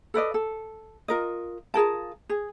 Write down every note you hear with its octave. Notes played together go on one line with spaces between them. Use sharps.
A4 B4 D5 D#5
A4
F4 A#4 D#5
F4 G#4 A#4 A5
G#4